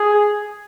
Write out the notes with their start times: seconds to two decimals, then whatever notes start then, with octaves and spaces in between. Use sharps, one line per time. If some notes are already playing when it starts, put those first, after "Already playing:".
Already playing: G#4